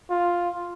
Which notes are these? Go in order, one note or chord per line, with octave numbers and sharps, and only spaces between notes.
F4